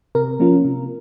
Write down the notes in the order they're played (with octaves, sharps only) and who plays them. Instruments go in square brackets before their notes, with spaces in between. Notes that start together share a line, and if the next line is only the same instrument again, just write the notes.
[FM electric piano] C3 A#4
F3 A#3 C#4 F4
C3